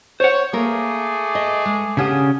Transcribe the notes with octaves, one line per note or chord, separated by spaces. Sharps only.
C5 C#5 F#5
A3 A#3 G#4 A#4 D6
D#5
G#3
C#3 C#4 D4 G4 F#5 D#6